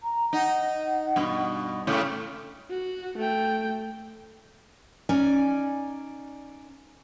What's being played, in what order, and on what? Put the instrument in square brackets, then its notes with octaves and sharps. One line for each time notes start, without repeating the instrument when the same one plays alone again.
[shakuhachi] A#5
[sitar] D#4 [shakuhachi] F#5
[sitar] G2 B2
A2 C#3 A3
[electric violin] F#4
A3 G5
[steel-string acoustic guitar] C#4 D#4 D5 G#5